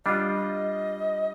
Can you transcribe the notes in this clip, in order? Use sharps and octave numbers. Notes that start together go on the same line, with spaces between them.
G3 D4 F4 D#5